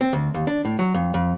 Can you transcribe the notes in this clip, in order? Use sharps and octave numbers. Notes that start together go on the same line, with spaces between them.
C4
D2
D#2
D4
A2
F#3
F2
F2